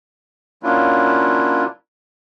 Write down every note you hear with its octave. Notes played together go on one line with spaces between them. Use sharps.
F#3 A#3 C#4 D4 E4 F4